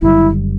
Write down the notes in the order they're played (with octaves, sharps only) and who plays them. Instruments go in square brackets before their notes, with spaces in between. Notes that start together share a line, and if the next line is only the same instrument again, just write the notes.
[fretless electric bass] F#1 F#2 D3 G3 [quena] E4